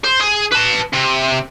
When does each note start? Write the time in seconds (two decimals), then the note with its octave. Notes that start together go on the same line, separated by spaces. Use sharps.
0.04 C5
0.20 G#4
0.51 B4 A5
0.93 C3